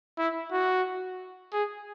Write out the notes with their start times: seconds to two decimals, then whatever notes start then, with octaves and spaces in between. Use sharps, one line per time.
0.18 E4
0.52 F#4
1.53 G#4